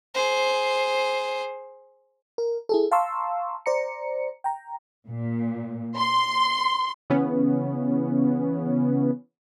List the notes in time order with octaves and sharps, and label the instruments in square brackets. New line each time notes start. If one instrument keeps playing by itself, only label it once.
[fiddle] G#4 C5
[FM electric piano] A#4
E4 G#4 A4
F5 A5 A#5 C6 C#6 E6
C5 D5 A#5 C#7
G5 A#5
[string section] A#2
C6
[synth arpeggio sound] C#3 E3 B3 C#4